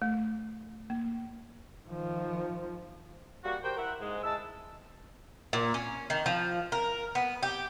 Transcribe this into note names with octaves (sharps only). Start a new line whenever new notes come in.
A3
A#3
D#3 F3
G3 A#3 F#4
G4 A#4 C5 G5
E4 A#4 E5 F#5
G#2 G#3
G#3 E4 A5 E6
A#2
C#4
D#3
F3
A#4
B3
G4